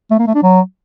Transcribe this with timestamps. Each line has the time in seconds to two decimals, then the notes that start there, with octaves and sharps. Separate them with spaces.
0.11 A3
0.19 A#3
0.27 A3
0.35 D4
0.43 F#3